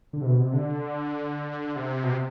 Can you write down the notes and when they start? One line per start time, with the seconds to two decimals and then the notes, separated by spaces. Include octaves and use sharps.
0.13 D3
0.21 C3
0.26 B2
0.40 C3
0.53 D3
1.76 C3
2.03 B2
2.10 C3